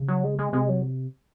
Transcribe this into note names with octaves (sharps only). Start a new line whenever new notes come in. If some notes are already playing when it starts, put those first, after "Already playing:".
Already playing: C#3
F#3
G#3
G#3
C3 G#3
F#3